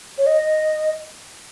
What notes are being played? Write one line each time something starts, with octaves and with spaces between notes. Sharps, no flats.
C#5
D#5